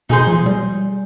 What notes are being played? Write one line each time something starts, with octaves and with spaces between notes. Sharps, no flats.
B2 D#4 G#4 C5
F3
G3